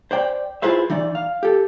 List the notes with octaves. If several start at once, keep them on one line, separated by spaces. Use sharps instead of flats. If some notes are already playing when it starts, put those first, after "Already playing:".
C5 D5 G5
E4 F4 G#4 B4 C5 E5
E3 D#4 D5
F5
G4 A4